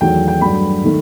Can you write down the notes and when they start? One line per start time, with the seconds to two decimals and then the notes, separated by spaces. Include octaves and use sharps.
0.01 E2 D#3 F#3 A3 G5
0.28 G5
0.41 G2 F#3 A3 B5
0.84 D#3 A3